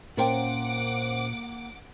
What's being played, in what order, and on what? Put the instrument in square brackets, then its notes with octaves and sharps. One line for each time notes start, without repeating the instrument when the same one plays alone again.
[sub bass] A#2 [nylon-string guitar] A#3 G5 [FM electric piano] C#4 A#4 C5 [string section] F#5 D6